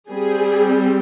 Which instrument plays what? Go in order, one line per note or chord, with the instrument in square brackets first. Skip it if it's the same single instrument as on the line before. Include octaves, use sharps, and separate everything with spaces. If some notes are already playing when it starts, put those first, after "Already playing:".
[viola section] G3 C4 G#4